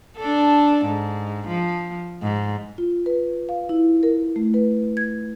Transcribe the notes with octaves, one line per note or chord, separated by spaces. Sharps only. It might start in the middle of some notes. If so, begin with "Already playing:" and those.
D4 A4
G#2
F3
G#2
F4
B4
F5
E4
A#4
A3
B4
G#6